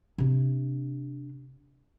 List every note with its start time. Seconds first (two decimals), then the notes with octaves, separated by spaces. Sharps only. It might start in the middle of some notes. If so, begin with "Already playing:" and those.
0.18 C3 D4